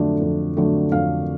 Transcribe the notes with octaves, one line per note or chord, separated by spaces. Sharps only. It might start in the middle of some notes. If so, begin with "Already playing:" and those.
Already playing: F2 D3 F#3 A3 D4
F2
D3 F#3 A3 D4
F2 F5